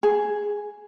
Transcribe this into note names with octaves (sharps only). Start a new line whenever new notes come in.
G#4